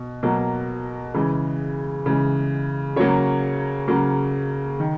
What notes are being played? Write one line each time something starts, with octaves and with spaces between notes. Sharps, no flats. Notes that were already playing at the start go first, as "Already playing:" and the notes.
Already playing: B2
B2 F#3 A#3
C#3 E3 G#3
C#3 E3 G#3
C#3 F#3 A#3 C#5
C#3 F#3 A#3
D#3